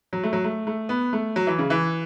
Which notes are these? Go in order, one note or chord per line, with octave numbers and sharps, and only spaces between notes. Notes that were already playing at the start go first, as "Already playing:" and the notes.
F#3
A3
F#3
A3
A3
B3
A3
F#3
E3
C#3
E3